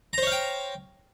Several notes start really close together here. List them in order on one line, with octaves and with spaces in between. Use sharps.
A#5 C5 C#5 F5 G5